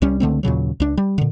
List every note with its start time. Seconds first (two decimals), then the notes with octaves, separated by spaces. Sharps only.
0.02 C2 G3 C#4
0.20 C#2 D3 A3 C4
0.43 D#2 A#2 C#3 F#3
0.80 C#2 D4
0.97 G3
1.18 A#2 D3